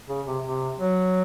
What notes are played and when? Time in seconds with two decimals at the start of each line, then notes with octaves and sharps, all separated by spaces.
0.09 C#3
0.26 C3
0.44 C3
0.78 F#3